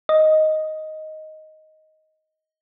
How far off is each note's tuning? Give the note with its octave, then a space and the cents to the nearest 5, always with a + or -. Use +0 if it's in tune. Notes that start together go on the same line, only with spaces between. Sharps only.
D#5 +5